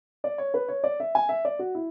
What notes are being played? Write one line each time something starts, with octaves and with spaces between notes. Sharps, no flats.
D5
C#5
B4
C#5
D5
E5
G#5
E5
D5
F#4
E4